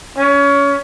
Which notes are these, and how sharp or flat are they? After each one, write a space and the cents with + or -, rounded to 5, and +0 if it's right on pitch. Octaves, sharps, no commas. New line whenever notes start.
C#4 +25